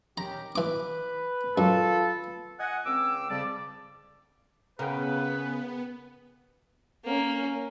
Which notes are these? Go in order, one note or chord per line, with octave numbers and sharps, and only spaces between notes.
D#3 C#4 G4 A#5
E3 B4 D6
F#2 F4 A4
D#5 F#5 G#5
C#2 C4 D6 E6
F2 C#3 G3 D5 A5 D6
C#3 B3 G#4 A#4 B4 F#5 G5
A#3 C#4